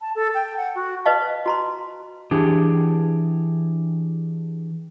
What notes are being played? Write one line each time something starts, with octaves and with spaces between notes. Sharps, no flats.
A5
A4
G5
F#5
F#4
B4 C5 D#5 F5 A5
F#4 A#5 C6
E3 D4 G4 G#4